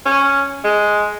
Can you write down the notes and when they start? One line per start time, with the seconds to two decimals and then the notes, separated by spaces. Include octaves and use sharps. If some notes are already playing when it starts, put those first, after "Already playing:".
0.06 C#4
0.64 G#3